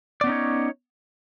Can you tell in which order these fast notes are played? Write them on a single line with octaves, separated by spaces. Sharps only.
D5 B3 C#4 D#4 C#5